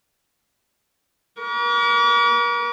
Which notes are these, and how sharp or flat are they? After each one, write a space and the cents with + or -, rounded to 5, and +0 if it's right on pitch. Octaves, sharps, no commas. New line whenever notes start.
A#4 +40 D6 -40